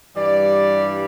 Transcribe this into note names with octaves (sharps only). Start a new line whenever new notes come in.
G2 E3 G3 D5